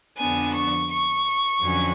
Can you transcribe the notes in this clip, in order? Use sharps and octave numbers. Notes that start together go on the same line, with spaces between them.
F2 D3 F3 B3 D4 G#5
C#6
C#6
F2 D3 F#3 C#4